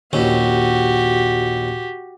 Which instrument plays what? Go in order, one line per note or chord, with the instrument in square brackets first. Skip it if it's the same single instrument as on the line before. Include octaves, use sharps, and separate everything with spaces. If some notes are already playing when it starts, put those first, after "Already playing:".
[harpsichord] A#1 D#2 C#4 [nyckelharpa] F#4 G4